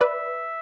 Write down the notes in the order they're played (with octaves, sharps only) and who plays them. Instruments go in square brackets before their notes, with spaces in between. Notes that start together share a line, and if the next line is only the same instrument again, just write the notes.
[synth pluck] B4 D5 [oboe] E5